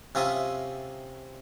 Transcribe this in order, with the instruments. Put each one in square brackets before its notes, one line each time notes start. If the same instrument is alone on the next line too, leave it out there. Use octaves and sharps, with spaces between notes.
[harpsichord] C3 C#4 F4 E5 D#6